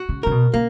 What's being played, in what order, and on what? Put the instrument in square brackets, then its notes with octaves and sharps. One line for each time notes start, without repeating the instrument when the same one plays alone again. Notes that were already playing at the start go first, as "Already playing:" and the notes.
Already playing: [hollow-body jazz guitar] F#4
[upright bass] C#3
[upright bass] C#3 [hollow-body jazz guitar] A#4
[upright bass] B2
[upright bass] C#3 [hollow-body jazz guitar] A#3